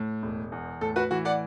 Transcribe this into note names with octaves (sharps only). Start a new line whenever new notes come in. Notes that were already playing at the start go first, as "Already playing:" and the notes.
Already playing: A2
E1
E2
A2 A4
F#4 B4
E3 F#4
D5 F#5